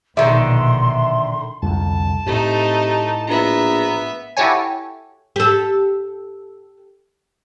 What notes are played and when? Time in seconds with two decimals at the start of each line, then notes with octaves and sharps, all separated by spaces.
0.17 A#1 B2 D3 D#3 G3 E5 C6
1.62 C2 F2 D3 A5
2.26 A2 C3 A3 D#4
3.27 A#1 B3 E5 A#5
4.37 E4 F#4 G4 A4 C#5 G#5
5.36 G4 A4